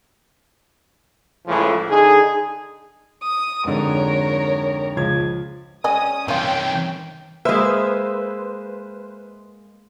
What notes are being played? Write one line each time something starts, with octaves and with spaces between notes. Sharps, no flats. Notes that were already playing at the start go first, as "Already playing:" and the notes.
C#2 A2 C#3 E3 F3
D3 D#4 G#4
D#6
F2 G#2 D3 A#4 C#5
C#2 F3 G#6
G#3 C#4 D5 D#5 G#5 D#6
C3 D#3 E3 C#4 D#4 F4 G5
G#3 A#3 B4 C5 E5